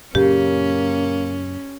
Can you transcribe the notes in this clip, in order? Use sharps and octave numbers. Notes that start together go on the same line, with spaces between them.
F#2 A#2 C#3 A#3 C#4 G4